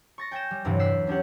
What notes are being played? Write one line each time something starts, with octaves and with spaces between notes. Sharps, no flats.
C#6 A6 A#6
G5 G#5 G6 A#6 E7
G3
E2 G2 C3 E3 F#3
E6 F#6 B6 C7
C#4 D4 G4 F#5